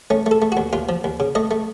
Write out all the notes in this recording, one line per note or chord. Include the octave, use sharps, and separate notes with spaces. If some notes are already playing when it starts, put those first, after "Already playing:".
A3 C#4
A3
A4
A3
D#2 F#4
D#2 F4
F3
D#2
C#3
A3 D#5
A3